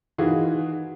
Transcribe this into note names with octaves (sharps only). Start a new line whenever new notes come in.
D#3 E3 D#4 F4 F#4 G#4